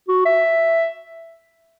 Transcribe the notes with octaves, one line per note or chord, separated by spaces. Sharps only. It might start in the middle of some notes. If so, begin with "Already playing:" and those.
F#4
E5